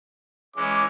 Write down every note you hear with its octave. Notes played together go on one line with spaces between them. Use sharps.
E3 G#3 C#4 D6